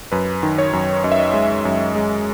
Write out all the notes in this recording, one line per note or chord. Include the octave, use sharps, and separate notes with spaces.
F#2 B4
D#3
C#5
F#2
F#2 D#5
E5
D#5
G#3
F#2
G#3